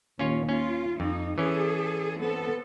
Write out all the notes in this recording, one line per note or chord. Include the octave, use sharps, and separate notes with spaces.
D#2 A#2 C#4 F4 C#5
C#4 F4
F2 D#4
E3 C#4 G#4 A4
B3 C4 A4